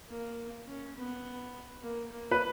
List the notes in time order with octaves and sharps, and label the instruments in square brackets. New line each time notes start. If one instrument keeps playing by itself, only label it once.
[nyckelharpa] A#3
C#4
B3
A#3
A#3
[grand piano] B4